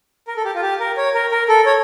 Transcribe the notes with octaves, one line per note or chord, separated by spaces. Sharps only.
A#4
A4
G4
F4
G4
A#4
C#5
A#4
A#4
A4
C#5